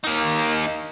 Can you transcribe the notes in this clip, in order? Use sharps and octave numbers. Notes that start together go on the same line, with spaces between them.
A#3 D#4